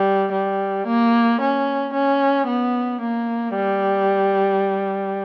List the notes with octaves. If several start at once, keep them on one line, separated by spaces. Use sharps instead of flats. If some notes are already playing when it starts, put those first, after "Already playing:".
Already playing: G3
G3
A#3
C#4
C#4
B3
A#3
G3